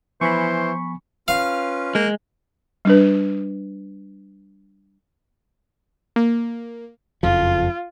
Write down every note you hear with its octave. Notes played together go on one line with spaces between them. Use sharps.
E3 F3 B3 C5 G#5 B5 C#6
C#4 F4 B4 F5
G#3 A#3
G3 D4 B4
A#3
F#1 F2 F3 F4